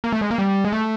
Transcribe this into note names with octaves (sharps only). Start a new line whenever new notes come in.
A#3
A3
G#3
A#3
G3
G#3
A3